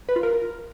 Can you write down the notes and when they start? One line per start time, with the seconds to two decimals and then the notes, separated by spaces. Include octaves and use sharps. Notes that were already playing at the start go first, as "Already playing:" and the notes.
0.09 B4
0.16 F4
0.23 A#4